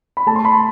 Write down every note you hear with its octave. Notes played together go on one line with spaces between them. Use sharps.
B5
A3 A5
C6
B5